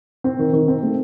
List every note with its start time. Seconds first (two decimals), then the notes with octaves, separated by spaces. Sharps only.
0.24 C4
0.39 D#3
0.53 D#3
0.68 C4
0.83 A3